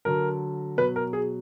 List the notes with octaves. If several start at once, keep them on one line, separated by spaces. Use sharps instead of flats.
D3 F#3 A#4
B2 F#3 B4
A#4
G#4